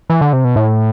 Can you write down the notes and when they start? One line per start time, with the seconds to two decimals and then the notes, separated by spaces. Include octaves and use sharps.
0.10 E3
0.21 D3
0.33 C3
0.44 B2
0.56 A2